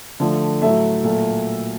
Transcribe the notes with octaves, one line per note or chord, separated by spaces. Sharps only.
D3 F3 A3
A2 F#3 A3 E5
A#2 F#3 A3